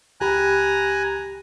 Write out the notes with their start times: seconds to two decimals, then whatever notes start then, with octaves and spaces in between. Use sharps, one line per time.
0.21 C#2 G4 G#5 A#5 B5 F#6